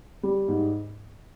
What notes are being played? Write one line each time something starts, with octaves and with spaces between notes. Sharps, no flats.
G3
G#2